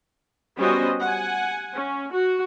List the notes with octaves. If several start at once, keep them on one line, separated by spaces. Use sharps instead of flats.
G3 B3 C#4 F#4 C5 D#5
F#5 G#5
C#4
F#4